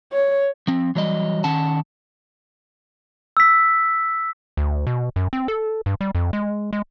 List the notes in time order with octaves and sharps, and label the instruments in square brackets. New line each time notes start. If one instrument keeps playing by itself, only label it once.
[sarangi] C#5
[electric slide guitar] F3 C4
E3 F#3 G3 D#5
D#3 C#4 F#5 A5
[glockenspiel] E6 B6
[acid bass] D2
B2
F#2
C4
A4
G2
G3
F2
G#3
G#3